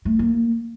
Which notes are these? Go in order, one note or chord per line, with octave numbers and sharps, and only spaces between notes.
A3
A#3